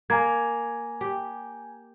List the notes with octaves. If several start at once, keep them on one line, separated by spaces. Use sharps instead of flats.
A#3 G#5 A#5 G#6
G4